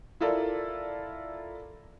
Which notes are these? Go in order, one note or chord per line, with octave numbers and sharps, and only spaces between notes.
E4 F4 A4 A#4 D5